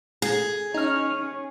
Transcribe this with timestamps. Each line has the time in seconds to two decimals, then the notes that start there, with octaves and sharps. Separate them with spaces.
0.22 G#4
0.74 C#4 D#4 F6